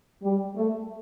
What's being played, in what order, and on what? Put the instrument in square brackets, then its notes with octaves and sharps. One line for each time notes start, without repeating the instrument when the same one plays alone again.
[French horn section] G3
A3